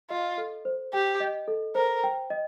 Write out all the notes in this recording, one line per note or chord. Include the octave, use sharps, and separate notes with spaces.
F4 D#5
A4
C5
G4 G5
D#5
A4
A#4 C5
G5
D#5